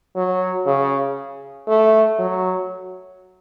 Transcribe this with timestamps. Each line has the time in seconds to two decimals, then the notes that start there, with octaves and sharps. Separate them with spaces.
0.17 F#3
0.67 C#3
1.68 A3
2.19 F#3